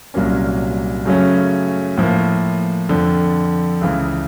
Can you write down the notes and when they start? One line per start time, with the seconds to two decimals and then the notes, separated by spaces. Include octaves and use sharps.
0.14 C2 A#2 F#3 A#3 C#4
1.06 F#2 C#3 F#3 A3 C#4
1.97 A2 F3 A#3
2.89 F2 D3 F3
3.81 C#2 C#3 E3